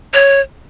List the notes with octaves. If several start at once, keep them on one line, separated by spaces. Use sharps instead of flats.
C#5